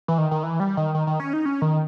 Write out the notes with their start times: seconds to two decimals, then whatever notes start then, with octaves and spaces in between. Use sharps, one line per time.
0.08 E3
0.18 D#3
0.31 D#3
0.43 E3
0.60 G3
0.77 D#3
0.95 D#3
1.07 D#3
1.20 C#4
1.33 D#4
1.45 C#4
1.62 D#3